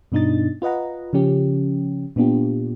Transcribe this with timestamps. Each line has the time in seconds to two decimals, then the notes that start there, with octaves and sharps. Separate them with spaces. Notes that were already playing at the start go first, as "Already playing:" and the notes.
0.12 G2 B2 D4 D#4 D#5 A6
0.62 F4 B4 D#5 F#5 A#5
1.13 C#3 F3 C#4 G4
2.16 A#2 B3 D4 F4 G4